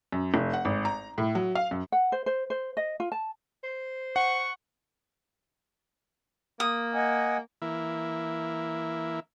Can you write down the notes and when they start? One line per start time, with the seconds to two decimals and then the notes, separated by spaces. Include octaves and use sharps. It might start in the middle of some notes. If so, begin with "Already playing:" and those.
0.12 F#2
0.34 F1
0.53 F#5
0.65 G#1
0.85 A#5
1.18 A2
1.35 F#3
1.55 F5
1.71 F#2
1.92 F#5
2.12 C5
2.26 C5
2.50 C5
2.77 D#5
3.00 F4
3.12 A5
3.64 C5
4.16 F#5 C#6
6.60 A#3 D#6
6.94 D#5 F#5 G#5
7.62 E3 A#3 E4